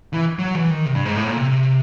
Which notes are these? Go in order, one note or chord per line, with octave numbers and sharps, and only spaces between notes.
E3
F#3
E3
D#3
C3
G2
G#2
A2
A#2
C3